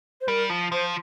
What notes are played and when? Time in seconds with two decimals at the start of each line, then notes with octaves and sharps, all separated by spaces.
0.21 C5
0.28 G3 A#4
0.50 F3
0.72 F3 C5